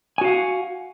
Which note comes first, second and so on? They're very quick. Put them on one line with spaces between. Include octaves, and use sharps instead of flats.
G#5 F#4 F5 F#5